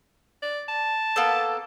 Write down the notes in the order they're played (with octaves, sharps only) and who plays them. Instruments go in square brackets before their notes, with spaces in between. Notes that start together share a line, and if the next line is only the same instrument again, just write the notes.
[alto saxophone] D5
A5
[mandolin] A#3 B3 A4